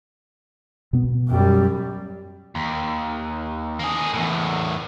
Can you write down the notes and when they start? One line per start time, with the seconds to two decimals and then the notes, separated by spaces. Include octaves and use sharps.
0.93 B2 B3
1.28 F#2 G3
2.55 D#2
3.79 A#3 G#4
4.13 E2 A2